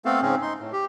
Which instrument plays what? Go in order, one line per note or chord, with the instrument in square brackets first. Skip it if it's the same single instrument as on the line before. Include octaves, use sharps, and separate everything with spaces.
[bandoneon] A3 B3 C4 A4 F5
G#2 C#3 C4 C#4
D#4 C6
A2
G4